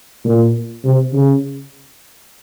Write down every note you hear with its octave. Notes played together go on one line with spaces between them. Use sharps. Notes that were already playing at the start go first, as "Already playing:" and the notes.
A#2
C3
C#3